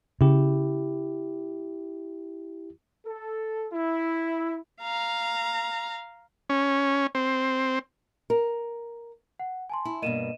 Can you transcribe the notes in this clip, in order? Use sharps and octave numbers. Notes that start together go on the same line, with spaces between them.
C#3 E4 G4
A4
E4
F5 A#5
C#4
C4
A#4
F#5
G#5 A5 C6
E4
G2 B2 A#3 D#5 D#7 E7